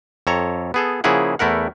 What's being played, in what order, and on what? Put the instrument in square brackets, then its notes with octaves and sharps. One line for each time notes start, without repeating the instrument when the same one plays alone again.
[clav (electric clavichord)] F2 A4 C#5 A#5
B3 G#4 A4
C#3 F3 A#3 E4 G#4 F#5
E2 A3 E4 A#4 F#5